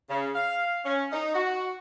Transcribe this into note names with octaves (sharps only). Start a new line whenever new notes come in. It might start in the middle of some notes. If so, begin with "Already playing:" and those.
C#3
F5
C#4
D#4
F#4